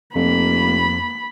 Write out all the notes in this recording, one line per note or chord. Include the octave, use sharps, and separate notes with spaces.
F1 F2 A#3 B5